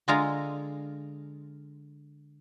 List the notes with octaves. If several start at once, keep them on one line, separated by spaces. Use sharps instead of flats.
D3 G#3 F4 G#4 G#5 A#5